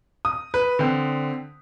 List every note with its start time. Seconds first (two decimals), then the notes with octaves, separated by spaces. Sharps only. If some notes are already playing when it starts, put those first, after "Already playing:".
0.25 D#6
0.54 B4
0.79 D3 C4